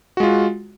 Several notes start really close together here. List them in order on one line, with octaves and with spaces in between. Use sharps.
F#4 G#3 F4